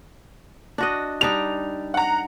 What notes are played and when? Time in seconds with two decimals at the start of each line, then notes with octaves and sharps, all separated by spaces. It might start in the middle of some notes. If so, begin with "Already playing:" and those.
0.78 D4 F#4 D#5
1.21 G3 D4 D#4 F7
1.94 F#5 A#5